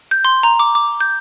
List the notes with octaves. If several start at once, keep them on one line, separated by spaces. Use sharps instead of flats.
G6
C6
A#5
D6
D6
G6